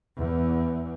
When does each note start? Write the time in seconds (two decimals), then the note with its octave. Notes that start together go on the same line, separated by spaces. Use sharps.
0.16 E2